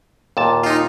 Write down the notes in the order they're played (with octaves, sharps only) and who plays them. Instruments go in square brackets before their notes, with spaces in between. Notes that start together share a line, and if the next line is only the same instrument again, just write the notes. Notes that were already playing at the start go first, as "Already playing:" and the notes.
[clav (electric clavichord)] D#2 A#2 A5
[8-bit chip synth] D#4 F4